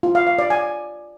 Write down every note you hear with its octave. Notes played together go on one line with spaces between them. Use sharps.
F4
F5
F5
D5
G#5